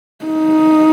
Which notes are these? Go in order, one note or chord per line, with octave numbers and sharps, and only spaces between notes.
D#4